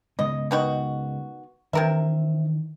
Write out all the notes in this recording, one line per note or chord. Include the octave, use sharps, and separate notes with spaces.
C#3 G#3 B3 D#5
B2 D#3 F#4
C3 D#3 E3 D4 A#4 E5